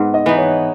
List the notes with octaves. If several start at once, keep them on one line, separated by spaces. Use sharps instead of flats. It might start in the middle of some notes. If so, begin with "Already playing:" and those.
Already playing: G#2 B3 F#5
D#5
E3 B3 D#4
C#5